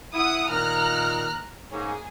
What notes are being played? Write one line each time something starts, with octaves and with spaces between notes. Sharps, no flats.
E4 F#5 D#6
A#2 D#3 A#5 F6 F#6
G#2 A#3 C#4 G#4